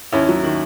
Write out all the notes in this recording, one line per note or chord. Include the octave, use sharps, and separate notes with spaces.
D#2 C#4 E4
F#3
D#3